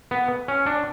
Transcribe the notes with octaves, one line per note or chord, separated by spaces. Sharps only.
B3
C#4
D4